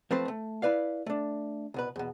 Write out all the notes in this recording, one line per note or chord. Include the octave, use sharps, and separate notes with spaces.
F3 A3 C4 B4 C5
A3
E4 B4 D5 F5
A3 D4
C2 B2 B4
E2 B2